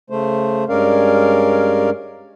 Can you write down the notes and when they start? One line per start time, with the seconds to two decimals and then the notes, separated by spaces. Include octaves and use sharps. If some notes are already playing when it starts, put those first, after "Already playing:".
0.10 C#3 A3 C5
0.69 G2 G#3 C#4 A#4 D5 F5